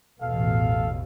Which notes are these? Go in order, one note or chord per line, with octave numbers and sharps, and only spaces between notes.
A1 E2 B2 A4 F5